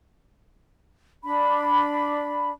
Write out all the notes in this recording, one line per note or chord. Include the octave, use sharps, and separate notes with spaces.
D4 B5